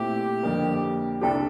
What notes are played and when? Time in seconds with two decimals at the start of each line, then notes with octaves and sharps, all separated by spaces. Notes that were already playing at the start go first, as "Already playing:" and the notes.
Already playing: A#2 A3 C4 E4 G4
0.43 F2 D3 G3 A#3
1.21 C2 C3 G3 D4 G4 A4